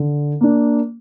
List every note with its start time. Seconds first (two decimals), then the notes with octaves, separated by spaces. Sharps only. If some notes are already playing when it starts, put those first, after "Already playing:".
Already playing: D3
0.41 A#3 D4